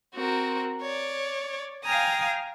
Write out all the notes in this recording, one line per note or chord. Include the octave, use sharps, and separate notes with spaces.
C4 F#4 A#4
C#5 D5
F5 G5 G#5 A#5 D#6